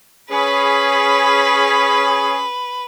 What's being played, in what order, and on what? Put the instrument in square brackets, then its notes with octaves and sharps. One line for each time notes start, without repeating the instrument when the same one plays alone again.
[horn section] C#4 G#4 [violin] B4 B5